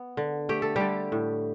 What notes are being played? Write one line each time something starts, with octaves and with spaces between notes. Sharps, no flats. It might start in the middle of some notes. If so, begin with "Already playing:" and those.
Already playing: B3
D3
A3 G4
A4
D3 G3 G4
A2